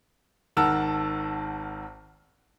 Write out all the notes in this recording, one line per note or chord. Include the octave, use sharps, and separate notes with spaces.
G#1 D#3 A#4 F#5 A5 E6